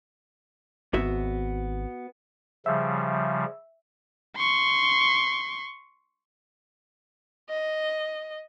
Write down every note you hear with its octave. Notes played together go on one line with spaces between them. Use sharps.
G#1 B3 F#4 E5
C#3 F3 G3 E5
C6 C#6
D#5